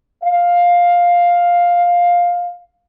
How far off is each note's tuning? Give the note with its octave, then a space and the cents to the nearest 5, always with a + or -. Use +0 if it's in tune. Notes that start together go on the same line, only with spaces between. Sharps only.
F5 +10